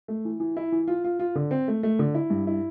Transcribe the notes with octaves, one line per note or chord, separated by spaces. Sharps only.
A3
E3
E3
E4
E3
F4
F4
F4
D3
C4
A3
A3
D3
E4
G2
E4